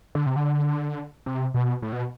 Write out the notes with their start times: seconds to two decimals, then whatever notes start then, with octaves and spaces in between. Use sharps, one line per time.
0.15 D3
0.26 C3
0.36 D3
1.26 C3
1.54 B2
1.82 A2
1.93 B2